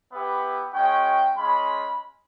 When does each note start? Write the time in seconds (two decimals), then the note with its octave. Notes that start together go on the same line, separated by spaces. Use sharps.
0.11 B3 E4 G4
0.73 G#3 C#4 F#4 G5
1.36 G#3 C#4 F4 B5